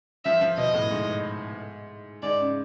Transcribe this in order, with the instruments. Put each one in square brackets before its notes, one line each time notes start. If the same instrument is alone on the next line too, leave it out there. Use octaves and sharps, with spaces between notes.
[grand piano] F3 [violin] E5
[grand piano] F3
[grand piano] B2 [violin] D#5
[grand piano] A2
G#2
[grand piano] G#2 [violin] D5
[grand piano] C#3